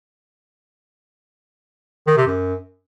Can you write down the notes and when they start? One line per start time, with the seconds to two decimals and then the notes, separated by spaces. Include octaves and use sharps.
2.07 D#3
2.17 C3
2.27 F#2